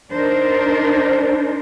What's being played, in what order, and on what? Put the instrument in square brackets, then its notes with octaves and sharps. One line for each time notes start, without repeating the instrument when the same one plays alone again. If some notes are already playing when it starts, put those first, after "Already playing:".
[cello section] D4 D#4 A#4 C5